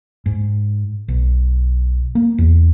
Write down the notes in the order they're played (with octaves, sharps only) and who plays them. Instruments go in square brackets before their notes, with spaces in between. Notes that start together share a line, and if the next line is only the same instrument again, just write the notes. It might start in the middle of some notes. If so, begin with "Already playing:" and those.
[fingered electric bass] G#2
B1
A#3
E2